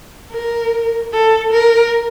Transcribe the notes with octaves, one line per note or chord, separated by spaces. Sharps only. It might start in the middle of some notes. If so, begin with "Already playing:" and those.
A#4
A4
A#4